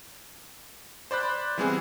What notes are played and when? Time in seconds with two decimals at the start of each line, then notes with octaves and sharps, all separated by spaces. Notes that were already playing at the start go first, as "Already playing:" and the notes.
1.11 C5 D5 B5 F#6
1.58 E3 G3 B3 C4 G#4